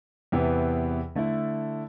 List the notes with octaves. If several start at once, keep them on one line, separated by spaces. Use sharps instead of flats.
E2 C3 E3 B3
D3 A3 E4